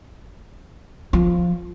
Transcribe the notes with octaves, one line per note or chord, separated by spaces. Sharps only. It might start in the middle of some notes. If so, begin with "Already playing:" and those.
F3